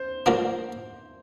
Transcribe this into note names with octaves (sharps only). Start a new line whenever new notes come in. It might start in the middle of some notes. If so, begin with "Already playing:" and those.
Already playing: C5
F3 A#3 D4